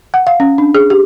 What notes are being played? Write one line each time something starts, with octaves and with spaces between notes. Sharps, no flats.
F#5
F5
C#4
D4
G#4
G4